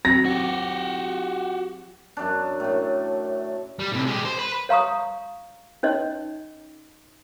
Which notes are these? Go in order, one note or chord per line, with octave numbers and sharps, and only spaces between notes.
F#3 C4 A#6
F#4 G4
F#2 D4
F#2 A2
G3
A2 C3
G#3 G4
C5
B4
C#5 F5 A#5 C#6 D#6
C#4 D#4 C#5 D#5